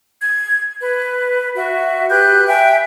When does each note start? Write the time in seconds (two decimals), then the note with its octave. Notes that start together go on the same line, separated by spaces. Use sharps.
0.20 G#6
0.79 B4
1.55 F#4 E5
2.10 G4 B4 F#6 G6
2.47 E5 G5 G#5